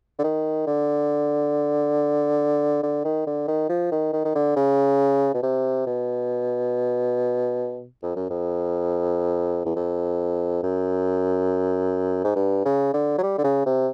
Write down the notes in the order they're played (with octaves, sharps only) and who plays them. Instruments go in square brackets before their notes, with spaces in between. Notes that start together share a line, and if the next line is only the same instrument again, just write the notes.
[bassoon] D3
D#3
D3
D3
D#3
D3
D#3
F3
D#3
D#3
D#3
D3
C#3
B2
C3
B2
F2
F#2
F2
E2
F2
F#2
G#2
G2
C#3
D3
F#3
G3
D3
C#3
C3